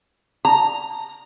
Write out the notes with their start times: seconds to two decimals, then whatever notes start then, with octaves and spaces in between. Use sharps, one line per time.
0.45 A#5